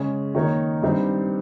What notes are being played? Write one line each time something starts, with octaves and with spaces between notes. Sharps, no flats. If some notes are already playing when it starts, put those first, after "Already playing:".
Already playing: C#3 G#3 C#4
D#3 A#3 D#4 A#4 C#5
G2 G3 C4 D#4